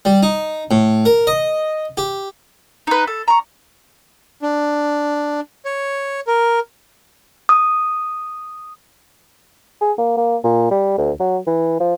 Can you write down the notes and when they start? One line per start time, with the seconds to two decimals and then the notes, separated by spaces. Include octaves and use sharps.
0.05 G3
0.23 D#4
0.71 A2
1.05 A#4
1.27 D#5
1.97 G4
2.87 D#4 B4
3.07 A4
3.28 A#5 C#6
4.42 D4
5.65 C#5
6.27 A#4
7.49 D#6
9.81 G#4
9.98 A#3
10.17 A#3
10.44 A#2
10.71 G3
10.98 D2
11.20 F#3
11.47 E3
11.80 F3